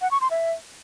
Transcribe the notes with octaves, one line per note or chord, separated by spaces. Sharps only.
F#5
C#6
C6
E5